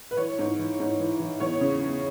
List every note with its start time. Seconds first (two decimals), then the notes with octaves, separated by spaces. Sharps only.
0.11 B4
0.17 E3 C#5
0.39 G#2
0.59 E3
0.80 G#2
1.00 E3
1.20 E3
1.40 E2 C#5
1.61 C#3
1.82 E2